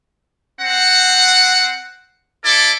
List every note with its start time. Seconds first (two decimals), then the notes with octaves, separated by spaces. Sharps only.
0.60 C4 F#5
2.44 E4 A4 D5